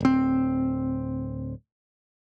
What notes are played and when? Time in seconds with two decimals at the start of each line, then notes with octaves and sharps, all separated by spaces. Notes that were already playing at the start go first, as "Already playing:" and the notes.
0.01 D1 C4